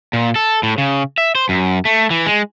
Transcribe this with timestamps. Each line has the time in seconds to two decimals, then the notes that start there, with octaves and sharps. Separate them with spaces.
0.13 A#2
0.36 A4
0.63 A2
0.78 C#3
1.18 E5
1.35 C5
1.49 F#2
1.85 A3
2.11 E3
2.26 G#3